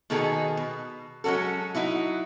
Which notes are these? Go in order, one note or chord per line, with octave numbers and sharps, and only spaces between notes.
B2 D#3 B3 D#4 G#4 A4
B2
F#3 G#3 C#4 F#4 A4
F#3 D#4 E4 F#4